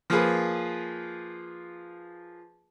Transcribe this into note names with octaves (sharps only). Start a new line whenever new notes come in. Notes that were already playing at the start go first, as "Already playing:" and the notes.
F3 A#3 F4 G#4 B4